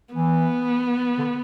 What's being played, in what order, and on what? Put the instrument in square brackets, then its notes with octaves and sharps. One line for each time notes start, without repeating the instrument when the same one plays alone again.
[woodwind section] E3 [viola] B3
[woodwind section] D3